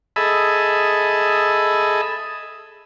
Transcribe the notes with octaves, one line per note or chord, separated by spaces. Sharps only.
G#4 A4 D#5 E5 B5